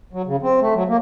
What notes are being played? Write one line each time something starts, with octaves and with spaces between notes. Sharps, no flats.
F#3
C#3
C4
A3
F#3
A#3